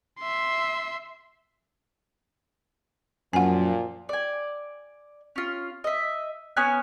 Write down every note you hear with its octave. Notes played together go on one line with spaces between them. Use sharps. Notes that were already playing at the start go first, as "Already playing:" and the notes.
E5 C6
F#2 A#2 F3 F#5 G#5
D5 G#5
C#4 F4
D#5 E5
B3 C#4 G#5 F#6